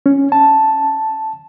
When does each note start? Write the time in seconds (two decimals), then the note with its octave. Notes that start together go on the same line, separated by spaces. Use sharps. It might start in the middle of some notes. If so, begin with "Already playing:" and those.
0.06 C#4
0.32 A5